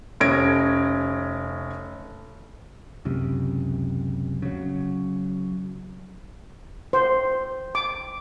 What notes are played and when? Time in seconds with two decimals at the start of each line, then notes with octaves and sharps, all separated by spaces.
0.20 F1 C#4 G#6 A#6 D7
3.05 C#2 F#2 C3
4.42 C#3 F#3
6.93 C5
7.75 D6